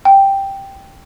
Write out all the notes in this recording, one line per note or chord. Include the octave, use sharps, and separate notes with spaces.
G5